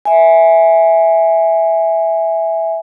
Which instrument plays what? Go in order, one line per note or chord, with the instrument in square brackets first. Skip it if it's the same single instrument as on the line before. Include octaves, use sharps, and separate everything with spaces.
[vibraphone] E5 G#5